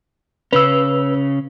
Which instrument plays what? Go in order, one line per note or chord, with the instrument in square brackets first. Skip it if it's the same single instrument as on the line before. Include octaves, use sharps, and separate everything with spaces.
[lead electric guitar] C#3 C#4 [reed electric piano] B4 E6